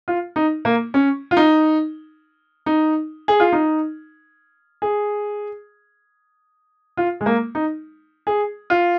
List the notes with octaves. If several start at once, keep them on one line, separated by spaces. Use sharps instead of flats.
F4
D#4
A#3
C#4
F4
D#4
D#4
G#4
F4
D#4
G#4
F4
G#3
A#3
D#4
G#4
F4